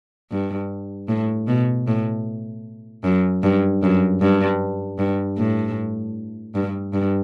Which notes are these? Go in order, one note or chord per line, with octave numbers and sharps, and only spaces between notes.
G2
A2
B2
A2
F#2
G2
F#2
G2
G2
A2
G2
G2